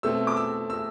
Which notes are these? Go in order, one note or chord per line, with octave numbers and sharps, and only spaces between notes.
B2 A3 C4 E6
D6
E6
E6